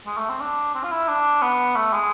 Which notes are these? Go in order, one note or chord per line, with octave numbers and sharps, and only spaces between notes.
G#3
A3
C4
D4
C4
F4
E4
D4
B3
A3
G#3